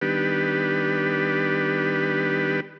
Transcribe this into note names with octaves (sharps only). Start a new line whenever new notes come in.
D#3 G3 B3 D4 G4 B4